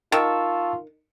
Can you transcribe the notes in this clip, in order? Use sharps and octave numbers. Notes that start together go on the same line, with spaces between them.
D#3 F4 A5 C#6 E6